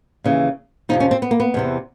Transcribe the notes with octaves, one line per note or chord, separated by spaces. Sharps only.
D#2 C#3 E3
F2 C3 F3 D#4
C#4
C4
B3
A#3
B3
E2 C3 E3